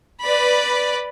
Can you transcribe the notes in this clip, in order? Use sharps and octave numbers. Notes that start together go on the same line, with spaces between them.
B4 D5 B5